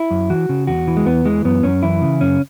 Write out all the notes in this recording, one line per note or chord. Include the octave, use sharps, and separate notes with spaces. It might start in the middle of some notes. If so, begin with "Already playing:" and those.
Already playing: E4
F#2
E3 F#4
C#3
E2 F#4
E3
G#3
E2 B3
E3 G#3
F#2 B3
F#2 C#4
E3 E4
C#3
F#2 C#4